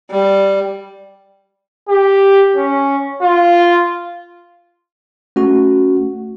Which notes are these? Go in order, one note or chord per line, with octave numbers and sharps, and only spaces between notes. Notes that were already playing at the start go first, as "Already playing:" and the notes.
G3
G4
C#4
F4
A3 C#4 F#4